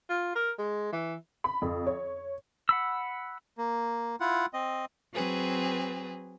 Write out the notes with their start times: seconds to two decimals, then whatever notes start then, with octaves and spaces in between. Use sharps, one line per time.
0.09 F4
0.35 A#4
0.58 G#3
0.92 E3
1.44 B5
1.62 F2
1.87 C#5
2.69 F#5 B5 E6
3.58 A#3
4.20 E4 F4 F#5
4.53 C4 D#5
5.14 F#3 C4 G#4 B4